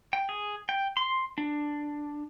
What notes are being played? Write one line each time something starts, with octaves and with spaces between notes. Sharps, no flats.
G5
G#4
G5
C6
D4